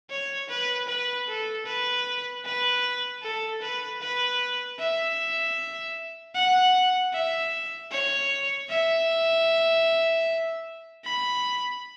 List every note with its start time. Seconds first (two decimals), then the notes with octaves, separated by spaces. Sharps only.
0.11 C#5
0.49 B4
0.88 B4
1.28 A4
1.66 B4
2.45 B4
3.23 A4
3.62 B4
4.02 B4
4.79 E5
6.35 F#5
7.13 E5
7.91 C#5
8.70 E5
11.04 B5